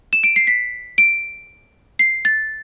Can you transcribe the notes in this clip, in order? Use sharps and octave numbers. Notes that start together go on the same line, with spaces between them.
E7
D7
C7
B6
D7
C7
A6